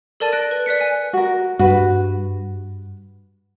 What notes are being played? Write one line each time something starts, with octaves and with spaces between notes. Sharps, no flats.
A4 A#4 D5 A5 A6 D#7
F#6 A#6 D7
B4
D5 F#6 B6 C#7
G#5
F#4 A#4
G2 F#4 B4